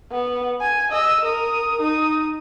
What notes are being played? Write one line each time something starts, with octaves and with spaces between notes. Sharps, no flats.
B3
G#5
D#5 E6
A#4 D#6
D#4 D#6